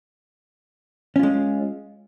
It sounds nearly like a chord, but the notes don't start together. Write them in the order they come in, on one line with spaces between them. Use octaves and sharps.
C#4 F4 G#3